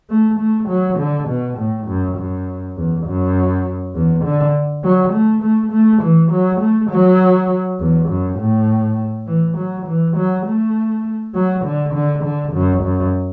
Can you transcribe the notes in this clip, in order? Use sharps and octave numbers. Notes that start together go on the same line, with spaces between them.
A3
A3
F#3
D3
B2
A2
F#2
F#2
E2
F#2
E2
D3
F#3
A3
A3
A3
E3
F#3
A3
F#3
E2
F#2
A2
E3
F#3
E3
F#3
A3
F#3
D3
D3
D3
F#2
F#2